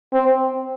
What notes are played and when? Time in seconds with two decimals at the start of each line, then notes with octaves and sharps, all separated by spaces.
0.14 C4